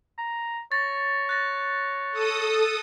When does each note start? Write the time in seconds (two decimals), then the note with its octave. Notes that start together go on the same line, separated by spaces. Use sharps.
0.18 A#5
0.72 C#5 A6 A#6
1.29 F#6 A6 A#6
2.11 A4 D#6